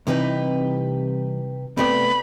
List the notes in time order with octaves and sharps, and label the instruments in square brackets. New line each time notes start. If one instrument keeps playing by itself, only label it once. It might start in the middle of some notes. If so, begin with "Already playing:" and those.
[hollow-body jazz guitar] C2 E3 D#4 [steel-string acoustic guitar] C3 G4 B4
[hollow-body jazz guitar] C3 A3 B3 [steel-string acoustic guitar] G4 D5 [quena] B5